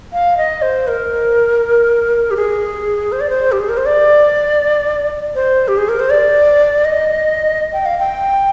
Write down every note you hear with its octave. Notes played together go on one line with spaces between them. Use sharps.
F5
D#5
C5
A#4
G4
G#4
C5
D5
C5
G4
G#4
A#4
C5
D5
C5
G4
G#4
A#4
C5
D5
D#5
G5
F5
G5